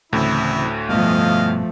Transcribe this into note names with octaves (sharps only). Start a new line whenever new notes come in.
D2 A2 C#3 E3 C4 E4
G2 B2 F3 A3 B3 D#5 F5